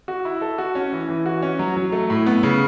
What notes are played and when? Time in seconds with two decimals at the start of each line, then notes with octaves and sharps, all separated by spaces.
0.08 F#4
0.25 E4
0.41 A4
0.58 F#4
0.75 C#4
0.92 E3
1.09 E3
1.26 F#4
1.42 C#4
1.59 F#3
1.76 F#3
1.92 A3
2.10 A2
2.26 B3
2.43 C#3